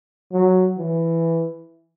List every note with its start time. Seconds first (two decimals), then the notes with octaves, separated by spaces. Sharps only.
0.33 F#3
0.78 E3